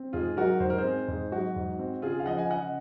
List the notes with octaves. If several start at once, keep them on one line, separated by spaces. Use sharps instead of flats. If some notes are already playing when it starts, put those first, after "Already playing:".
Already playing: C4
G#2 F4 G#4
F#3 F#4 A#4
G#2 C5
A#4
G#4 C5
C4
G#2
F#3 F#4
G#2
C4
C#3 F4 G#4
F5
F3 D#5 F#5
G#5
C#3 D#5 F#5